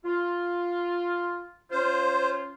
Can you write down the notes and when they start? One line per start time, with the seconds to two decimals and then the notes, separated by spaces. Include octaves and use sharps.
0.05 F4
1.71 C#4 F4 C5